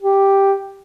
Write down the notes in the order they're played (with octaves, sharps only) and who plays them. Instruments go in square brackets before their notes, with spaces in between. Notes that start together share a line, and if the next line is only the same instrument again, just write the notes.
[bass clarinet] G4